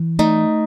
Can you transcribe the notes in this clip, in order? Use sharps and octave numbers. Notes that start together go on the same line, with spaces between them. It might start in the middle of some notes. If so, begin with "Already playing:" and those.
Already playing: E3
A3 D#4